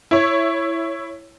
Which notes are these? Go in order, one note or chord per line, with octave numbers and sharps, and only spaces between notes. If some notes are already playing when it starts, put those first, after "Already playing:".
E4 C#5